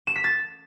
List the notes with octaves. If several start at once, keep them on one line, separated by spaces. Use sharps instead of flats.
E7
B6
A6